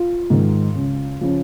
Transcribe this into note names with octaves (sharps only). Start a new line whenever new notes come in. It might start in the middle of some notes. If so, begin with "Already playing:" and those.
Already playing: F4
G#2 D#3
C#2
C#3 F3